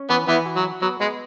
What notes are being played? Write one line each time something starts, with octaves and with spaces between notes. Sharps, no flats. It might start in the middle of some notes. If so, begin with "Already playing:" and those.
Already playing: C#4
E3 B3
E3 B3 E4
F#4
F#3
F#4
F#3 B3
G#3 B3